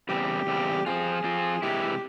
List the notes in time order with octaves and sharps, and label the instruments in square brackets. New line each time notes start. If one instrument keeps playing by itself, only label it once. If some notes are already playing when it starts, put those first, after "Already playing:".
[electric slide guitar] E2 C#3 G3 C4 [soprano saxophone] G4
[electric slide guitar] E2 C#3 G3 C4
[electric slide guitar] F3 C4 F4 [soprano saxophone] G#4
[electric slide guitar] F3 C4 F4
[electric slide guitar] C3 E3 G#3 E4 [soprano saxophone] G4